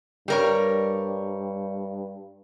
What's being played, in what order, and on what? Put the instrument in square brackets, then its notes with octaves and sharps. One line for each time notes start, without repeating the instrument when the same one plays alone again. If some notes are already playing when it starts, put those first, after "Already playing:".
[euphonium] G2 [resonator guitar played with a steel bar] G3 A#4 C#5